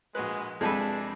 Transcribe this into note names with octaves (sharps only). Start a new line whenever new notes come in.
A#1 G#3 F#4 B4
F2 C3 G#3 D4 G#4 A4 B4